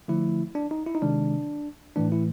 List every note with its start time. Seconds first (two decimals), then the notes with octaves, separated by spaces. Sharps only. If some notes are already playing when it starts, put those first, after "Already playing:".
0.08 D3 F3 A3 E4
0.55 D4
0.71 D#4
0.87 E4
0.95 D#4
1.02 C3 D#3 G#3 D4
1.96 A2 E3 A3 D4
2.12 E4